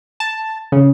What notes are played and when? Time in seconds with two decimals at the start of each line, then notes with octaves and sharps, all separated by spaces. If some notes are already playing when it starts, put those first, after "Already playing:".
0.20 A5
0.72 C#3